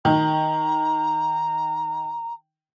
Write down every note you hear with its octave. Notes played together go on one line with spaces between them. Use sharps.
D#3 A#5